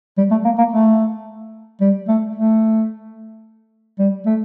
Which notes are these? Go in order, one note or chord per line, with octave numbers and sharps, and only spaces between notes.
G3
A3
A#3
A#3
A3
G3
A3
A3
G3
A3